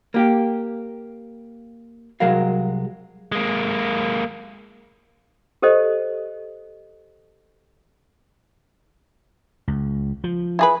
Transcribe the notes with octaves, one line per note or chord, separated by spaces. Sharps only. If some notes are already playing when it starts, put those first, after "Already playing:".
A#3 G4
C2 F#3 G#3 A#4 F5
G#3 A#3
G4 A4 C5 D#5
C#2
F3
E4 G#4 B4